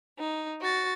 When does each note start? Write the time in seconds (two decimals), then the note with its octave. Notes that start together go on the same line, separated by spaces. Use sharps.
0.19 D#4
0.61 F#4 A6